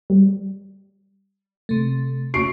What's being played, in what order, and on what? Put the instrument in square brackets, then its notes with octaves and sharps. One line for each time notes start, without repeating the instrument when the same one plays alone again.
[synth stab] G3
[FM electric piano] C3 A3
[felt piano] C#6 C7 D7